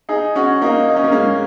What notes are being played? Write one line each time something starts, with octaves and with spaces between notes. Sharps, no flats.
D#4 G#4
C#4 F#4
A#3 D#4
D#4
C#4
A#3
G#3 C#4